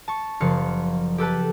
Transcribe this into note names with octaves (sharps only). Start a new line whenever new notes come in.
A5 C#6
F#1 F3 F5 C#7
G4 A4 B4 A5